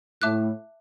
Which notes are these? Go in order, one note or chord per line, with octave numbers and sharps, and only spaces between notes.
A2 E5 A5 D6 F#6